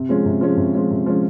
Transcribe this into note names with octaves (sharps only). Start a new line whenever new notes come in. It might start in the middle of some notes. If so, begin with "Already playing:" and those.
Already playing: C3
F3 G#3 C#4
C3
F3 G#3 C#4
C3
F3 G#3 C#4
C3
F3 G#3 C#4